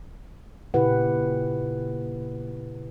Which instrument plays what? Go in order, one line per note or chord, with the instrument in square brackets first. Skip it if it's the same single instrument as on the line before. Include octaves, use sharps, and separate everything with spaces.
[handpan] A#2 C#3 E4 G4 B4 F#5